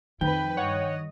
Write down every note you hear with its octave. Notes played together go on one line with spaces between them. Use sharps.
F2 D#3 F3 B4 G5
G2 C#5 D#5 F#5